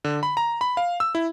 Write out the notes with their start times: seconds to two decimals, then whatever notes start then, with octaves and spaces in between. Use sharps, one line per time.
0.04 D3
0.23 B5
0.37 A#5
0.61 B5
0.77 F5
1.00 E6
1.15 E4